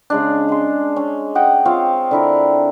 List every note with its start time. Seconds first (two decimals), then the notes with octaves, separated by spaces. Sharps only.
0.10 C#3 G#3 D4
0.49 G#3 C6
0.96 C#4
1.35 D#5 F#5 G5
1.65 C4 F4 C5 C#5
2.11 D3 E4 A#4